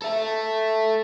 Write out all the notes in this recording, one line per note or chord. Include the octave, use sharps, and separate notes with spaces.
A4 E5